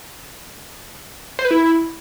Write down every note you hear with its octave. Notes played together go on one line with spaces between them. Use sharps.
C5
B4
E4